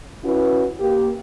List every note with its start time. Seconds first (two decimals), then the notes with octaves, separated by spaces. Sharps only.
0.24 C#4 E4 F#4 B4
0.80 A#3 G4